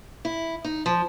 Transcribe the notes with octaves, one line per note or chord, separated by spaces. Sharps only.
E4
D#4
F3